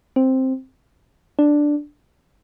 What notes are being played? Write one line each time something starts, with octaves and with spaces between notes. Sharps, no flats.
C4
D4